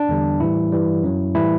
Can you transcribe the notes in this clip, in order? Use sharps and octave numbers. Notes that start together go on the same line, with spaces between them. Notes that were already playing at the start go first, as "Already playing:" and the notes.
Already playing: D4
E2 D3 G3
A2 E3 G3 E4
G2 E3 G3
F#2 F#3
A2 E3 G3 E4